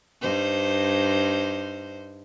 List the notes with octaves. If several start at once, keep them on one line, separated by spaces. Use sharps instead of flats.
G2 D#4 C5